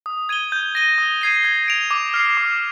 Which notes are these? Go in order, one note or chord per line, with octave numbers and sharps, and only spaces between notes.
D#6
G#6 D#7 G7
G6
A#6 D#7 G7
D#6
G#6 C7 D#7
G#6
D7 F7
D6
F6 C7
D6